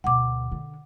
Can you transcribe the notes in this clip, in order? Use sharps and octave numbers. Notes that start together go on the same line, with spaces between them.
D2 B2 F#5 D6
D3